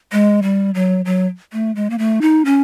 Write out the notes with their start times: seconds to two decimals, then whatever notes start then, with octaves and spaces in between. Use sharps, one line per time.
0.12 G#3
0.43 G3
0.74 F#3
1.05 F#3
1.53 A3
1.75 G#3
1.90 A#3
1.98 A3
2.22 D#4
2.45 C#4